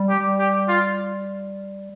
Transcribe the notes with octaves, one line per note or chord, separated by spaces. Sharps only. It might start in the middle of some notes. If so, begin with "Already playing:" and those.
Already playing: G3
G4
G4
F4